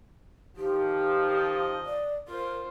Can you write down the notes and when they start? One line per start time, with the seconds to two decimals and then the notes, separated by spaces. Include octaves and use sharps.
0.56 D#3 F3 G4
1.31 D#5
1.86 D5
2.28 F4 A#4 C5